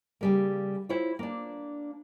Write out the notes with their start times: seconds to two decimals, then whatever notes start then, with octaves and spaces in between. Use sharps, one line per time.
0.21 C#3 G3 A#3
0.89 E4 F4 C5 C#5
1.19 A#3 D4